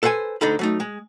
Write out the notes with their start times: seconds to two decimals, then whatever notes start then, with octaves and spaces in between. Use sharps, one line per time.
0.03 A4 B4 C5 F#5 G#5
0.41 D2 D3 D#4 A4 B5
0.59 F#3 A3 D#4
0.80 G#3